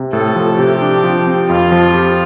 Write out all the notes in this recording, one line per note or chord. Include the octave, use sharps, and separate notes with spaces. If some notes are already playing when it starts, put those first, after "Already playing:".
Already playing: C3
A2 A4
F3
C3 G4
D4
F3
C4
F2 F4
F3
G4